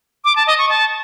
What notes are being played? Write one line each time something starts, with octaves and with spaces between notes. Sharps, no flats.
D6
A5
D#5
C#6
A5